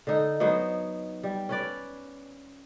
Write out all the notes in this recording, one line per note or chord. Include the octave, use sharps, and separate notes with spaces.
D3 D#4
F#3 B3 D#4 C5
G3
C#4 B4 D5